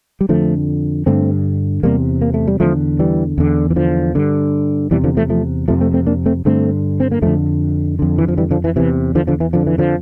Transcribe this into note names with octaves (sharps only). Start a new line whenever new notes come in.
G3
F2 D3 F3 A3
G2 D3 A3 C4
E2 C3 G3 A#3
A#3
A3
G3
E2 D3 F3 A3
E3 G3
E2 D3
E3
D3 F3
G2 D3
E2 C3 E3 G3
D3 F3
F3 A3
F3 A3
F2 C3 F3 A3
A3 C4
A3 C4
A#3 D4
A3 C4
G2 D3 A3 C4
C4
A#3
F2 D3 F3 A3
F2 D3
E3
F3
E3 G3
D3 F3
E3
E2 C3 E3
D3 F3
D3 F3
E3
F2 D3 F3
E3
D3 F3